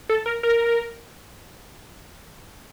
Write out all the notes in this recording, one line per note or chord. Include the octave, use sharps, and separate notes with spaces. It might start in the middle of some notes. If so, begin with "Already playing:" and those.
A4
A#4
A#4